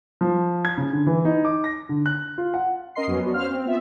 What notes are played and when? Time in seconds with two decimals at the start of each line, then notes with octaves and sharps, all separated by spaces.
0.21 F3
0.65 G#6
0.78 C#3
0.93 D3
1.07 E3
1.25 D#4
1.45 D6
1.64 A#6
1.89 D3
2.06 F#6
2.38 F4
2.54 F#5
2.95 C#4 A#4 D#5 C6 C7
3.07 F2 F#3 B3 C#4
3.22 B3 D4 F#4
3.34 C#4 C5 F5 F6
3.50 C4
3.65 B3 F4 E5